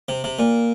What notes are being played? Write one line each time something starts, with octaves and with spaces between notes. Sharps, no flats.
C3
C3
A#2